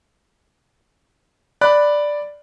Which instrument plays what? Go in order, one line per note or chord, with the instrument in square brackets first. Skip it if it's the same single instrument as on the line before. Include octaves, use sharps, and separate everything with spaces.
[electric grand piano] D5 B5 F#6